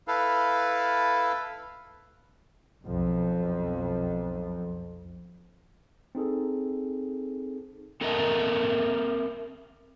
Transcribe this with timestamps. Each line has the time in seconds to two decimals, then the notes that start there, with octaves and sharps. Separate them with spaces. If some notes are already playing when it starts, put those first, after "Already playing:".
0.08 E4 A4 B4 F5
2.85 B1 F2
6.15 C4 D#4 G#4 A4
8.01 C4 A4 A#4 D#5 E5 A5